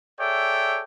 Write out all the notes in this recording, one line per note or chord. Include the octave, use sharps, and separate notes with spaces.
G#4 A4 C#5 D5 E5 G5